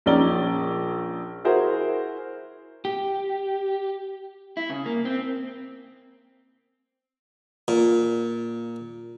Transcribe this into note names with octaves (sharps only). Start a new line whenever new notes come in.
A#1 C#4 D#4 D5 A#5 G7
E4 F#4 G#4 A#4 C5 E5
G4
E4
C#3
A#3
C4
A#2